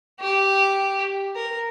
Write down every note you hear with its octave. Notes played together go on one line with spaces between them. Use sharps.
G4
A#4